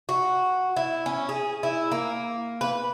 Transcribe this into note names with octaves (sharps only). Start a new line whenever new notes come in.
F#4
E4
C#4
G#4
E4
A#3
B4